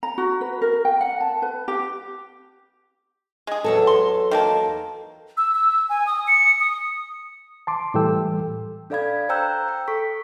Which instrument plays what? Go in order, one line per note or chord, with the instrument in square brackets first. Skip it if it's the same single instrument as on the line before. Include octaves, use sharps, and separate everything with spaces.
[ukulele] A#5
F#4
B4
A#4
G5
F#5
A5
B4
G4
[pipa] G#3 G#4
[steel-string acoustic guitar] E2 F#3 A4
[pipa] C6
D#3 A#3 A5
[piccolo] E6
E6
G#5
D#6
C#7
D#6
[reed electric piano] A5 C6 D6
A2 E3 G3 A4 G5 E6
[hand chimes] D4 A4 D5 F5 B5 G#6
C5 G5 A#5 E6 F#6 G6
G5
A4 C#6 B6